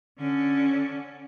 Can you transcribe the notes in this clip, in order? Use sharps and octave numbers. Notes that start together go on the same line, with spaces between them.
D3 C#4